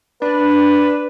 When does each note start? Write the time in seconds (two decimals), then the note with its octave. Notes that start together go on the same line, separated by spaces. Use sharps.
0.22 D4 B4